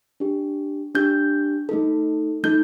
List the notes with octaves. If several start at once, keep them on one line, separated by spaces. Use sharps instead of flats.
D4 G4
D4 G4 G6
A3 D#4 A4
A3 D#4 A4 G6